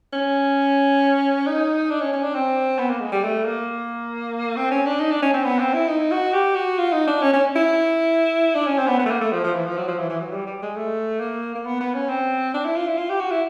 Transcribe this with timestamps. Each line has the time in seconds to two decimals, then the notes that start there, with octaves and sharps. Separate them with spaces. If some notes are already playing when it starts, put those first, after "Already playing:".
0.13 C#4
1.46 D#4
1.91 D4
2.01 C#4
2.12 C#4
2.23 D4
2.34 C4
2.78 B3
2.90 A#3
3.01 G#3
3.12 G3
3.23 A3
3.45 A#3
4.56 C4
4.71 C#4
4.86 D4
5.00 D#4
5.11 D4
5.22 C#4
5.33 C4
5.44 B3
5.59 C4
5.74 E4
5.89 D#4
6.11 F#4
6.33 G4
6.55 F#4
6.78 F4
6.92 D#4
7.07 D4
7.21 C#4
7.33 C#4
7.56 E4
8.55 D4
8.66 C#4
8.78 C4
8.87 B3
8.99 B3
9.05 A3
9.11 A#3
9.21 A3
9.32 F3
9.44 F3
9.55 E3
9.66 F3
9.77 F#3
9.88 F3
9.99 E3
10.09 E3
10.21 F#3
10.32 G3
10.47 G3
10.62 G#3
10.77 A3
11.20 A#3
11.55 A#3
11.65 B3
11.80 B3
11.94 C#4
12.09 C4
12.54 D4
12.65 E4
12.76 F4
12.88 E4
12.98 F4
13.09 G4
13.20 F#4
13.31 E4